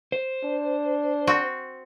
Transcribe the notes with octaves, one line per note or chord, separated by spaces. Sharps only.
C5
D4
C4 F#4